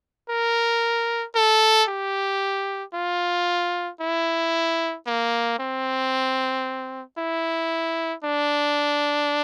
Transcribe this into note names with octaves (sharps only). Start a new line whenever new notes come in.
A#4
A4
G4
F4
E4
A#3
C4
E4
D4